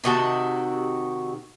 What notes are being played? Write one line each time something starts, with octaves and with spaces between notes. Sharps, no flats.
C3 D#3 F#4 A5